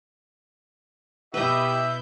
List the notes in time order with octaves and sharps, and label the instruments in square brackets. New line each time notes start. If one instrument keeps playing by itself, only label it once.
[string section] B2 E4 G6 [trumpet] G4 [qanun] B4 D#5 [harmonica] E5